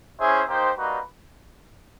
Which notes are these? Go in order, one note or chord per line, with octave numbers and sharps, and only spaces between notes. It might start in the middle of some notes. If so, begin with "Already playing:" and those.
C#4 E4 G#4 C5 E5
A#3 D#4 G4 C5
G3 A#3 D#4 F#4 B4